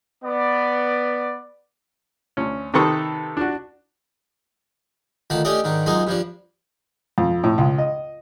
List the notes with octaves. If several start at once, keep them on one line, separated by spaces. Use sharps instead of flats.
B3 D5
D2 C#4
C3 D#3 A4 B4 C#6 D#6
D4 F#4
D2 D#3 F4 A5 B5
A3 C#4 D4 G4 D5 D#5
G#2 D#3 D4
F#2 G#3 D#4 F4 D#5
G2 F3 D4
F2
A2
C#2
D#5